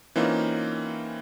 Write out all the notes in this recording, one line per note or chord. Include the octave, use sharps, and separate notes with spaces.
E3 A#3 C4 C#4 D#4 F4